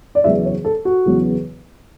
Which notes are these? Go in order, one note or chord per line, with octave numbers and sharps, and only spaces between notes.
D5
E2 C#3 F#3 B3 E5
C#5
A4
F#4
E2 C#3 F#3 B3